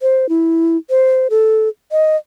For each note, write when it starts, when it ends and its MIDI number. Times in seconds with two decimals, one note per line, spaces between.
0.02 0.29 72
0.29 0.77 64
0.90 1.28 72
1.30 1.68 69
1.92 2.16 75